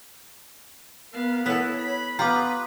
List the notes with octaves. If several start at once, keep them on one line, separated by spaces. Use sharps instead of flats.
B3 A#4 F5
B3 E4 A4 C#5 F#6 B6
B5
B3 F4 G4 B4 A#5 D6